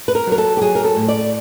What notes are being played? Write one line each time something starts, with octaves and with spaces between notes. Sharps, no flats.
B4
A#4
F#3
A#4
A4
G4
F#3 G#4
A#4
A4
A2
D5